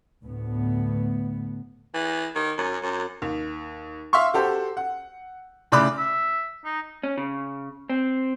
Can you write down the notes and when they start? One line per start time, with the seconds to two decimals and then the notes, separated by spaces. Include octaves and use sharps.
0.23 D2 A2 B3
1.94 E3
2.35 D#3
2.58 F#2
2.82 F#2
3.22 D#2
4.13 E5 F5 C6 C#6
4.34 F#4 G4 A4 C5
4.77 F#5
5.72 A2 C#3 D5 B5 D6 F#6
5.98 E5
6.65 D#4
7.03 C#4
7.17 C#3
7.90 C4